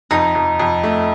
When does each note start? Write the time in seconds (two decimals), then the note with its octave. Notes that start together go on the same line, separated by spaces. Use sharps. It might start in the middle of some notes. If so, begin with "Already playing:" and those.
0.11 F2 D#4
0.35 F2
0.60 F2
0.84 A3